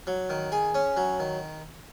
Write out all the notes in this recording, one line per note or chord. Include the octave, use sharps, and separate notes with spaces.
F#3
D#3
G#4
C#4
F#3
D#3